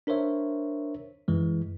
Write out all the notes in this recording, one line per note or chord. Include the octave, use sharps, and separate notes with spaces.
D4 A#4 C5 C#5 E5
F#2 E3 G#3